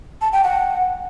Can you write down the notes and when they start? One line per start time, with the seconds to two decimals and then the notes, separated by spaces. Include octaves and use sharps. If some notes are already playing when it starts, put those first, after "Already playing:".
0.22 A5
0.33 G5
0.44 F#5